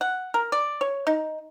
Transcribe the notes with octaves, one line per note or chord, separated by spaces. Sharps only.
F#5
A#4
D5
C#5
D#4